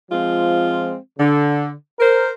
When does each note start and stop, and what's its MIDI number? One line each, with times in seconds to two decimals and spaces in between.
0.11 0.95 53
0.11 0.95 56
0.11 0.95 60
0.11 0.95 65
1.19 1.72 50
1.99 2.29 70
1.99 2.29 72